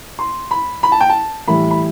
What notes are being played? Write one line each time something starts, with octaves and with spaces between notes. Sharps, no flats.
C6
B5
B5
A5
G5
A5
A2 E3 G3 B5
B5